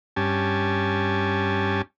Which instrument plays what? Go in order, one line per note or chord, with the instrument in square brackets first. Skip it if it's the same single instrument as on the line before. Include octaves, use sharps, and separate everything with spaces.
[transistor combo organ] G2 C#4 G4 G#5 A5